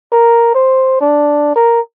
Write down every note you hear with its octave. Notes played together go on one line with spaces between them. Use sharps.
A#4
C5
D4
A#4